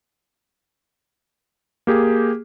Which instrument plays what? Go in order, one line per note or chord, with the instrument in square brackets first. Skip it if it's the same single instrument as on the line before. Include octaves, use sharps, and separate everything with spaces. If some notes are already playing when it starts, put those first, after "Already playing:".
[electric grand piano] A#3 G4 G#4